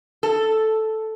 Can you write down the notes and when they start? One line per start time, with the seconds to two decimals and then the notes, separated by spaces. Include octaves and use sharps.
0.23 A4